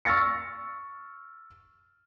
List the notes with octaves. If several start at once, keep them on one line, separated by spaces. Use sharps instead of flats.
C#6 E6 F6 A6 A#6 C#7